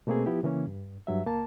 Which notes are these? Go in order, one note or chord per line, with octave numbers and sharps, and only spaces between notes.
B2 A3 A#3 C4 G#4
F3 B3 E4 G4
C#3 E3 A#3 C#4
G2
G2 F#3 E5
C#2 A#3 A5